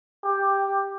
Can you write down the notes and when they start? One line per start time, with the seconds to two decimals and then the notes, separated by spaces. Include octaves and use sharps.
0.24 G4